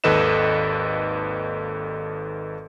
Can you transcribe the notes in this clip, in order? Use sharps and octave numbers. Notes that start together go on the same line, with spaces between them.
G#1 D#2 A4 B4 D#5 E7